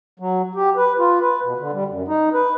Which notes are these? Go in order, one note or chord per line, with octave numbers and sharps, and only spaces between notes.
F#3
G4
B4
F4
B4
B2
D3
G3
F#2
D#4
B4